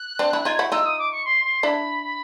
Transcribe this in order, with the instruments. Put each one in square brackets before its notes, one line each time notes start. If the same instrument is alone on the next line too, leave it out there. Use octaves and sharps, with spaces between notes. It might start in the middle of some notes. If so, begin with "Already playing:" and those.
Already playing: [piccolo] F#6
[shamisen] C4 D4
D4 E4
[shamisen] D#4 F4 [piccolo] G#6
[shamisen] E4 F#4
[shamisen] D#4 F4 [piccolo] E6
[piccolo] D#6
D6
C#6
C6
C6
[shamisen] D4 E4 [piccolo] B5
[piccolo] B5